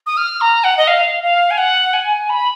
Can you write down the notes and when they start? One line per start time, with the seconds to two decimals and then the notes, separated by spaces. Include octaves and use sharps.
0.06 D#6
0.17 F6
0.41 A#5
0.64 F#5
0.77 D#5
0.88 F5
1.23 F5
1.51 G#5
1.58 F#5
1.93 G#5
2.30 B5